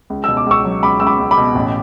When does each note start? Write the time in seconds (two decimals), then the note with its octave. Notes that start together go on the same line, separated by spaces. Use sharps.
0.10 C#2
0.24 B2 E6
0.37 D6
0.46 C#2 C#6 E6
0.65 F#3
0.82 C#2 B5 D6
1.00 C#2 E6
1.07 B5 D6
1.19 C#2
1.31 B5 D6
1.37 B2
1.55 A1